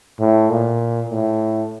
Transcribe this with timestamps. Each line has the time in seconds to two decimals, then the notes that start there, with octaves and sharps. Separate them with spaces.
0.20 A2
0.50 A#2
1.09 A2